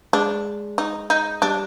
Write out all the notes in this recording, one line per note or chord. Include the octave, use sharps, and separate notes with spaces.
G#3 D4
D#4
D#4
G3 D4